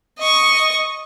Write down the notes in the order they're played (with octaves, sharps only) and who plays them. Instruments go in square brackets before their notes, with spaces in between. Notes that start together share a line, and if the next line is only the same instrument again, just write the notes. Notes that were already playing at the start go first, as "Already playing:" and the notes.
[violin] D#5 C#6